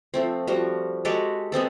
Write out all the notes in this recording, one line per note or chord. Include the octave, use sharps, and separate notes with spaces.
F3 A3 C4
F3 G3 F#4
G#3 F#4 G4 A4
G#3 B3 C4 A4